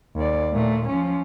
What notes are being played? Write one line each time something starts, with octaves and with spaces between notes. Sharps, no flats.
D#2 D5
A#2 A3
F3 C#4